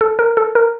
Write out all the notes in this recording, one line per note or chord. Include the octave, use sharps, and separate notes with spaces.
A4
A#4
A4
A#4